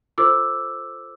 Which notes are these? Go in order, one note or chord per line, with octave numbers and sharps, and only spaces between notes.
F4 A4 C5 D6 E6